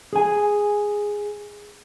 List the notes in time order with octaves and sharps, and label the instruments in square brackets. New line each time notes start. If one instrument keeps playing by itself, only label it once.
[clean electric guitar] G#4 G#5